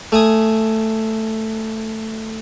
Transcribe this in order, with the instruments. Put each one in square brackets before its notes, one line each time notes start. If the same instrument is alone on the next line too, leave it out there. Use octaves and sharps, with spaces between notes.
[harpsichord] A3 G#5 D#6